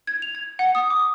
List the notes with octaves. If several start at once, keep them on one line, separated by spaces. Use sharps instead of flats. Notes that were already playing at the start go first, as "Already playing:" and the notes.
G#6
F7
G#6
F#5
D#6
D6